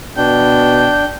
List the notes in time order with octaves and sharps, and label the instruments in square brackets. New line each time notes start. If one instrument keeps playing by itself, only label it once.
[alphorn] B2 [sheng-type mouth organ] D4 [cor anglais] G5